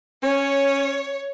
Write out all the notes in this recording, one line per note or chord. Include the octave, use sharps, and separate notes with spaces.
C#4 C#5